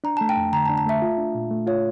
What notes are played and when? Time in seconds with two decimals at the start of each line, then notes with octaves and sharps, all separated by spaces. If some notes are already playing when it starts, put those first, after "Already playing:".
0.04 D4 A#5
0.17 A5
0.21 A3
0.29 G5
0.37 F2
0.53 D3 A#5
0.66 A5
0.69 D4
0.78 A5
0.86 A3 E5
1.02 F4
1.18 D4
1.35 A#2
1.51 A3
1.67 F4 C#5